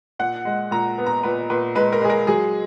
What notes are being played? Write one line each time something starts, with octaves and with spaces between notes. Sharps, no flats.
A#2 F#5
G#3
A#2 A#5
B3
A#5
A#2 B4
A#2 B4
G#3 B4
A#4
G#3 G#4
A#4
F#3 G#4